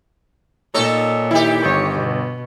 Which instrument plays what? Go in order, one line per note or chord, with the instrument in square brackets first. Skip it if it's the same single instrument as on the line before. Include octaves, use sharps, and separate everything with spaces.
[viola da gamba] A#2 [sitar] D#4 A4 C#5
[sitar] D#3 G4 [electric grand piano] E4
[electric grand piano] G1 [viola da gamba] C#5
[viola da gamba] B2